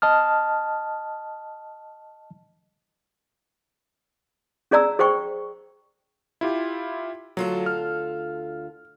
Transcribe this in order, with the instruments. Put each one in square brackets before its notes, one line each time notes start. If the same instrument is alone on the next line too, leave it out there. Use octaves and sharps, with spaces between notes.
[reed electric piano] D#5 A5 D#6 F6
[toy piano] C#4 G#4 D5 A#5 E6
G#4 C5 G5 C#6
[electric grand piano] E4 F4 G4
[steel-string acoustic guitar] D2 F4 A4 [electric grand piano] F#3
[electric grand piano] F6